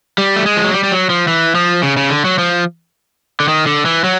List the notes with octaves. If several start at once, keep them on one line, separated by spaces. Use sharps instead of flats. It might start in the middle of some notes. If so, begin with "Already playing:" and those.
G3
A3
G#3
F3
F#3
G3
G3
F#3
F3
E3
F3
C#3
C#3
D3
F#3
F3
D3
D#3
D3
E3
F#3